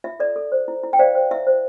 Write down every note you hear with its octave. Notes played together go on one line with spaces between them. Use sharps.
F4 E5
A4 D5
A4
C5
E4
E4
G5
C5 D5 F5
C5
E4 E5
C5